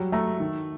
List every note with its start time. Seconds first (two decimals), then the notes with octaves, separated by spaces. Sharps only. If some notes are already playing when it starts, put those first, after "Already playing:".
Already playing: F#3 G3
0.12 A3 A#5
0.40 D#3